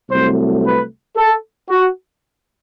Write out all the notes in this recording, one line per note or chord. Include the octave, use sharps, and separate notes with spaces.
C2 C3 F#3 A3 C5
B4
A4
F#4